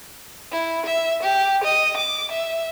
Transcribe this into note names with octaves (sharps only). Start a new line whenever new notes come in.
E4
E5
G4
D#5
D6
E5